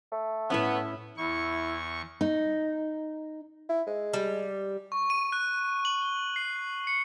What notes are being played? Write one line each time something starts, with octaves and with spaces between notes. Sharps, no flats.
A3
A2 B3 C#4 E4 E5
E2 E4 C#6
D#4
E4
G#3
G3
C#6
D#7
F#6
F#7
G7
C7
C#7